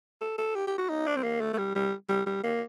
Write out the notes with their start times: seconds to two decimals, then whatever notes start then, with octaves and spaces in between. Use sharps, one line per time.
0.21 A4
0.38 A4
0.55 G4
0.67 G4
0.78 F#4
0.89 D#4
1.07 D4
1.16 C4
1.24 A#3
1.41 A3
1.53 A3
1.58 G3
1.75 G3
2.09 G3
2.26 G3
2.44 A#3